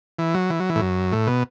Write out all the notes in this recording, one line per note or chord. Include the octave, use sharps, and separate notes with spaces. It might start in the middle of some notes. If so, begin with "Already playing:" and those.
E3
F#3
E3
F#3
E3
A2
F#2
A2
B2